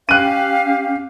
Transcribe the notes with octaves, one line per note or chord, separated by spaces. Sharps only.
C#4 G4 F5 F#6 D#7